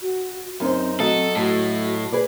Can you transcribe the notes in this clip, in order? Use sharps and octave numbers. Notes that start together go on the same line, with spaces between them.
F#4
F#2 C4 D#4 C5
F#3 A3 C4 A4 D#5
A2 F#4
G#4 B4 D5